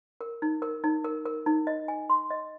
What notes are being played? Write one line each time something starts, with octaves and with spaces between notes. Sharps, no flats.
A#4
D#4
A#4
D#4
A#4
A#4
D#4
D#5
G#5
C6
D#5